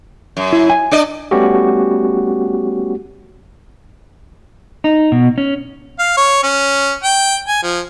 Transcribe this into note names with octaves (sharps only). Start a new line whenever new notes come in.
F#2
E4
G#5
D4 D5 D#5
G3 A3 B3 C#4 F#4 G4
D#4
B2
C#4
F5
C#5
C#4
G5
G#5
F3